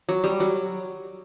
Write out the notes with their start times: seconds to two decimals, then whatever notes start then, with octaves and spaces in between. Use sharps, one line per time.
0.09 F#3
0.24 G3
0.40 F#3